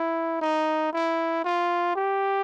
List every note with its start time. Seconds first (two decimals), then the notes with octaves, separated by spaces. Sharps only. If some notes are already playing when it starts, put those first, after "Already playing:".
Already playing: E4
0.41 D#4
0.92 E4
1.44 F4
1.96 G4